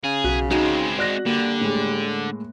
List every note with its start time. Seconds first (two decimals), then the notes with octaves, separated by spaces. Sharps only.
0.04 C#3 G#4
0.24 B1 F#3 F#6 B6
0.51 G#3 C4 D#4 F#4 G#5 B5
0.99 F#4 D5 F#6 A#6
1.26 D3 G3 A#3
1.61 A2 G#3